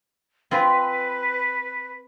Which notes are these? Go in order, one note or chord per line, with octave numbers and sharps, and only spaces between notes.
C4 F4 B4 G#5